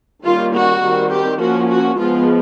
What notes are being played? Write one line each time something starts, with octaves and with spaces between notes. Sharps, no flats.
D#3 G3 A#3 C#4 F4
F#4
D#3 G3 C4
G4
F3 A#3 C#4 F#4
F#4
F3 G#3 B3 F4